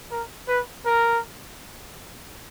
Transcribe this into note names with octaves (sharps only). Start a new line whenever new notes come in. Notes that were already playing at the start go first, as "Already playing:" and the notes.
A#4
B4
A#4